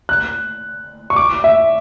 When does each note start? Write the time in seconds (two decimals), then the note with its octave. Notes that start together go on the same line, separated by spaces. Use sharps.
0.09 F#6
1.10 C#6
1.16 D6
1.44 E5